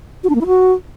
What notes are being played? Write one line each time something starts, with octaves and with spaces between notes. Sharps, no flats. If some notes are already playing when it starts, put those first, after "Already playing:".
F#4
D4
A#3
E4
F#4